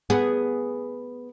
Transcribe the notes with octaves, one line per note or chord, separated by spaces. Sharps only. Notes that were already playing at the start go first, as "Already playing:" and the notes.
B3 G#4